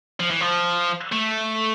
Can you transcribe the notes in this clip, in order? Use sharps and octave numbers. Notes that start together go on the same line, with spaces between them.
F3
E3
F3
A3